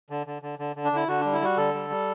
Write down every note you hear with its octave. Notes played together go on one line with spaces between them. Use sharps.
D3
D3
D3
D3
D3
D4
D3 E4
D3 F#4
G3 D4
E4
G3 F#4
D3 A4
G3
G3